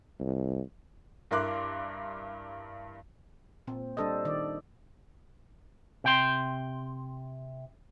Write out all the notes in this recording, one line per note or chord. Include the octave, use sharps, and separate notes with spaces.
C2
G2 E4 A#4 C6 D6 F#6
A#2 C4
G3 D4 A4 C5 D#5
D#3 D5
C3 G5 C6